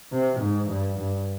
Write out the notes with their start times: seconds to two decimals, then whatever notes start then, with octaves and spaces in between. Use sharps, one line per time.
0.12 C3
0.40 G#2
0.69 G2
0.99 G2